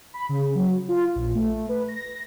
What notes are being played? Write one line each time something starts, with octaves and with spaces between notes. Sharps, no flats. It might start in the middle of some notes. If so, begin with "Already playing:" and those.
B5
C#3
F#3
F4
A#1
A3
B4
A#6